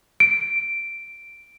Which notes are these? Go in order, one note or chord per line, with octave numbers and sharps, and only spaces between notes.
D7